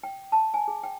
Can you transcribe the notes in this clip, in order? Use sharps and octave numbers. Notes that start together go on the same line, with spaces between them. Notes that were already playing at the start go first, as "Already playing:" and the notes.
G5
A5
G#5
G#4
G5